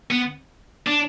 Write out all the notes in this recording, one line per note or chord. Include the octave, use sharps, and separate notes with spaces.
B3
D4